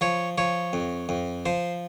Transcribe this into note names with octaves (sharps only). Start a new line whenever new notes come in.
F3 C#5
F3 C#5
F2
F2
F3 C5